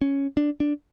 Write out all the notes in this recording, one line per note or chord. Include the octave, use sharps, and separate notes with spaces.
C#4
D4
D4